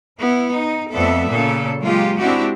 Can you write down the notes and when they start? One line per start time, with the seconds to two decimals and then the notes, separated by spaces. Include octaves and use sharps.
0.18 B3 E4
0.53 D#4
0.93 F2 A3 B3 A4 D5 E5
1.29 A#2 C#3 A4
1.81 F#3 G#3 A#3 F4 G4
2.19 G#3 C4 D4 E4 F#4 G4